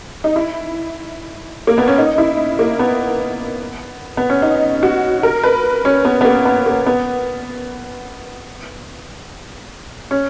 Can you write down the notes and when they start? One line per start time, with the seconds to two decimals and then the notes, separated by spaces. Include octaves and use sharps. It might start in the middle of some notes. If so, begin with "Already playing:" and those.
0.24 D#4
0.36 E4
1.67 A#3
1.78 B3
1.88 C#4
1.98 D#4
2.18 E4
2.59 A#3
2.79 B3
4.17 B3
4.30 C#4
4.42 D#4
4.83 F#4
5.23 A#4
5.43 B4
5.85 C#4
6.05 B3
6.21 B3
6.25 A#3
6.45 B3
6.66 A#3
6.86 B3
10.11 C#4